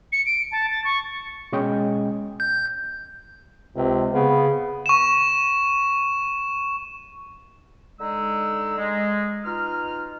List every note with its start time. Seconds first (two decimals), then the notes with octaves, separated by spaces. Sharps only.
0.12 C#7
0.26 D7
0.52 A5
0.71 A6
0.84 C#6
1.52 B2 G#3 C#4 D#5 G5
2.40 G6
3.76 C#2 C3
4.14 C#3 B3
4.86 C#6 E7
7.99 D3 G#3 D#4 E6
8.78 G#3
9.45 B2 D#4 F4 F6